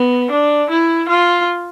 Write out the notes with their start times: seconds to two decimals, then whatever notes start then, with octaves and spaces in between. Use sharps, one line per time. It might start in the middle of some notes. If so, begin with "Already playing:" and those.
Already playing: B3
0.31 D4
0.71 E4
1.09 F4